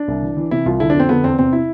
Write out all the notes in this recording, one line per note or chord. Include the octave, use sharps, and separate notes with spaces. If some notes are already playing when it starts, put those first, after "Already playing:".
Already playing: D4
C2
E3
E3
C3 E4
C2 F4
D3 E4
D4
F2
C4
D3 B3
E2 C4
C3 C4
E4